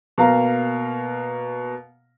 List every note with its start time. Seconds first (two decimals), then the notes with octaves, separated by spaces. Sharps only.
0.18 B2 A#3 F5 A#5